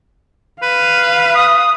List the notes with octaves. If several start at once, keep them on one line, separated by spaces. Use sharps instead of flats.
B4 F5
D#6